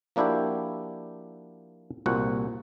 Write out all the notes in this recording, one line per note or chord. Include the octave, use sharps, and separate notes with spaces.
F3 A#3 D4 E4 F#4 G4
C2 A#2 F#4 C5 F#5